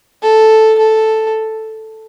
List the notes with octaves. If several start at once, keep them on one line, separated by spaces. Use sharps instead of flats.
A4
A4